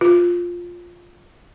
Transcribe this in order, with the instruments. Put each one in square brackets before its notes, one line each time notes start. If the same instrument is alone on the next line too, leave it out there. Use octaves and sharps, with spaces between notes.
[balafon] F4